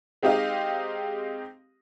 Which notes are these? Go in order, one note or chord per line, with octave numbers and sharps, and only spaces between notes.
G#3 C4 D#4 G4 D#5 F5